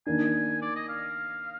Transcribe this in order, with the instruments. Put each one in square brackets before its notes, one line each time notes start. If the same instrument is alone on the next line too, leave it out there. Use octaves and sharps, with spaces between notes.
[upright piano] D#3 A#3 D4 [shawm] G#5
[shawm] D5
D#5
F5